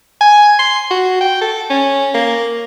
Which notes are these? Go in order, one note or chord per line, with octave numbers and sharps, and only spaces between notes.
G#5
C6
F#4
G5
A4
C#4
A#3